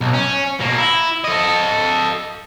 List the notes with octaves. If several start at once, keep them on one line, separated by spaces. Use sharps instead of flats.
B1
C#4
B2 A#3
E4
A4 D#5